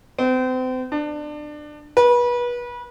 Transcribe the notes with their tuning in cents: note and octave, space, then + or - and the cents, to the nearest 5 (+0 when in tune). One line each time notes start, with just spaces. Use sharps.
C4 -35
D4 +25
B4 -30